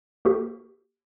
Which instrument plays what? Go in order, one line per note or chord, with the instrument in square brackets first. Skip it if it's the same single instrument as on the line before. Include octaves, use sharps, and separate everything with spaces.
[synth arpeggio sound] A#3 F#4 G4 A4